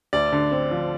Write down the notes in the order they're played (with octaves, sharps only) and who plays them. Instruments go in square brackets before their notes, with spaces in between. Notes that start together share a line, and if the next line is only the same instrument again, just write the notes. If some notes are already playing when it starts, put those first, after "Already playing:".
[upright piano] D2 [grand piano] D5
[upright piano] D3
C4
F3